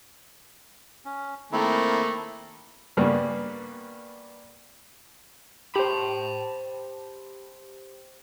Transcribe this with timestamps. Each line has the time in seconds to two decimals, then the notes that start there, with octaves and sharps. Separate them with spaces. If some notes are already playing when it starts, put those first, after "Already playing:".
1.05 C#4
1.52 D#3 A3 A#3 C4 E4
2.97 G2 C#3 G3 A#3 B3
5.76 G4 C5 A5 B5